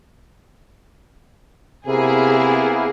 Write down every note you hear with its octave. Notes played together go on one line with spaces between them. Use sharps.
C3 A#3 B3 E4 G#4